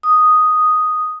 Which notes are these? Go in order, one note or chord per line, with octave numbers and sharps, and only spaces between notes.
D#6